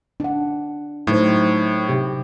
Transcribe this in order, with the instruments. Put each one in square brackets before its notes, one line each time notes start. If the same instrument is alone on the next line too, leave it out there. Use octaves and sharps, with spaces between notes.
[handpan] D4 F#5
[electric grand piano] A2 [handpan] F#3 D#4 C5
[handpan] C3 G4